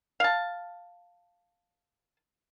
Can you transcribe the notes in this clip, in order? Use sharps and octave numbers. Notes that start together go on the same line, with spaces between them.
F5 A5